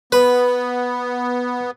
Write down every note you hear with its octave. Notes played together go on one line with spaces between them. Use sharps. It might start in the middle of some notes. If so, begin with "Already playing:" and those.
B3 B4